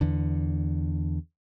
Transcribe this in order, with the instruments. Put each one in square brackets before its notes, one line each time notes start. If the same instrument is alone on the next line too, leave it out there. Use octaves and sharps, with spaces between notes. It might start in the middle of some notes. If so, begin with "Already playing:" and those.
[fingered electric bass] E2 D3